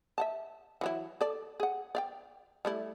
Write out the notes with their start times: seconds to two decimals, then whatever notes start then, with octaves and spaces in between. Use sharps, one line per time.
0.18 E5 F#5 A5
0.81 E3 F#3 E4
1.21 A4 D5
1.60 G#4 F#5
1.95 D5 F5 G5
2.65 G3 A3 E4